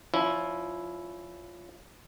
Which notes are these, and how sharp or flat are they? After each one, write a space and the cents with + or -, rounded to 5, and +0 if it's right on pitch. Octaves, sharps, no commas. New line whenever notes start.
F3 +0 C#4 +30 E4 +0